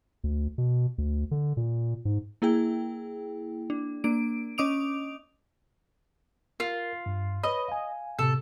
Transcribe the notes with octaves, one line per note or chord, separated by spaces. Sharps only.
D2
B2
D2
D3
A#2
G#2
A#3 E4 G#4 G5
D4
A#3 D4 D7
C#4 D#5 D6 D#6 D7 F7
F4 A#4
G2
B4 C#5 D#5 B5
F5 G#5
A2 C3 A4